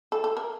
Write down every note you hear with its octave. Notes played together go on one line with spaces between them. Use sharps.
A4
A4
A#4